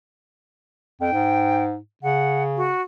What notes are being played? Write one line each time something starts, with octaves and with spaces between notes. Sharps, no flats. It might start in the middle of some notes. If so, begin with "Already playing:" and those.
F2 G5
G#2
C#3 F#5
F#4